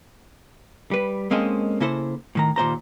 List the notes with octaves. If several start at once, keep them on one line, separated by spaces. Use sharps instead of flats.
G3 B4
G#3 A#3 C4 C#4 A4 D#5
C#3 A#3 E4 A4 C5
A2 D#3 A#5
D#2 A#2 C5 A#5